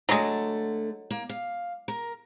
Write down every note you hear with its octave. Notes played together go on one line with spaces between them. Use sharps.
D3 F#3 G#3 A3
A#3
F5
A#4